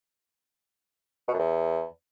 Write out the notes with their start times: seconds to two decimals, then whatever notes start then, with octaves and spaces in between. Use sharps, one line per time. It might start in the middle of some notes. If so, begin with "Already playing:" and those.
1.28 B2
1.34 F#2
1.39 E2